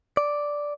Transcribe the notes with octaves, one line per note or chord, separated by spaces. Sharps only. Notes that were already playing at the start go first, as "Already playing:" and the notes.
D5